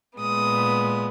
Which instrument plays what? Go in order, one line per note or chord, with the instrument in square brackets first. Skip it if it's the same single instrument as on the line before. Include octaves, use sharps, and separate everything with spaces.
[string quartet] A#2 G#3 B3 D#6